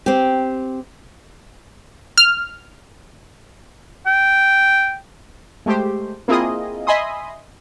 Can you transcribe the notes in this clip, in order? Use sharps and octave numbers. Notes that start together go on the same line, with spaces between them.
C4 G4
F6
G5
G#3 A3 G4 C5
A#3 C4 E4 F4 G#4 D#5
D#5 E5 G#5 B5 C6 D#6